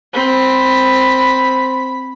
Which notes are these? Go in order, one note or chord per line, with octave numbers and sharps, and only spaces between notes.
C4 B5